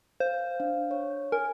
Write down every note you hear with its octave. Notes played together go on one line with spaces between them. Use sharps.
C5 F5
D4 F5
C#5
A#4 G#5